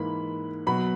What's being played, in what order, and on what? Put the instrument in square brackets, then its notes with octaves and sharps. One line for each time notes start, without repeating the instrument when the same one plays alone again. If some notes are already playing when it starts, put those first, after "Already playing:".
Already playing: [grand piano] G#2 E3 A#3 [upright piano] B5
[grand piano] B2 F#3 B3 F#4 [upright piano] B5